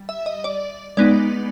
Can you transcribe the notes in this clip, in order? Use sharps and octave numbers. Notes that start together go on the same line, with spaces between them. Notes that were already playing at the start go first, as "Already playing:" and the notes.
Already playing: G3
E5
D#5
D5
G#3 B3 D#4 D5